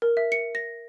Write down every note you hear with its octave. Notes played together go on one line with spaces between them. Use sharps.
A#4
E5
C#7
A#6